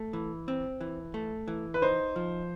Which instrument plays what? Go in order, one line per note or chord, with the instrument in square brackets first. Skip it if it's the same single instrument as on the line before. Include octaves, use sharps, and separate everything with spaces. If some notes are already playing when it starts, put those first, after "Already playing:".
Already playing: [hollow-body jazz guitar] A3
E3
C4
E3
A3
E3
[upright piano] B4
[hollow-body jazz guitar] D#4 [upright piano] C5
[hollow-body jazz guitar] F3